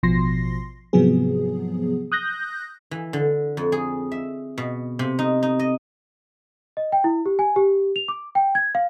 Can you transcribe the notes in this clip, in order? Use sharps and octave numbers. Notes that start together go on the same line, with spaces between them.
A1 B2 F3 C6 A#6 C7
G#2 C3 F3 F#3 B3 G#4
D#6 F#6 G6 A#6
E3
D3
F2
G#4
E5
B2
C3
D#4
D#4
D#5
D#5
G5
E4
G4
G#5
G4
F7
D6
G5
G#6
F5